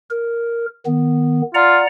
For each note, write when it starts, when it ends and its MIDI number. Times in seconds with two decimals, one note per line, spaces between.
0.10 0.66 70
0.86 1.42 51
0.86 1.42 59
1.55 1.80 65
1.55 1.87 74
1.55 1.87 78
1.55 1.87 82